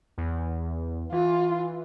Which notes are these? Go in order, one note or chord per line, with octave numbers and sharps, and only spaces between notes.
E2
E3 F4